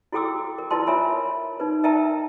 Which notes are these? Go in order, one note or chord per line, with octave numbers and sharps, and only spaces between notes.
E4 F#4 A4 G5 D6 E6
A#4
E4 F4 B4 D#5 A5 C6
F4 A#4 C#5 E5 G#5 B5
D#4 B4
A#4 D#5 E5 G5 A5 A#5